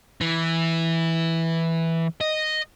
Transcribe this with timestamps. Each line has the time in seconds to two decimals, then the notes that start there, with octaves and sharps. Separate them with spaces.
0.21 E3
2.21 D#5